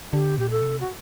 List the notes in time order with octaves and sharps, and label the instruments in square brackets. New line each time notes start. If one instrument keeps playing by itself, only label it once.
[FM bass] D3 [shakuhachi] G4
[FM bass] A#2 [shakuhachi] G4
[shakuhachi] A4
[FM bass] C3
[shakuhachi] F#4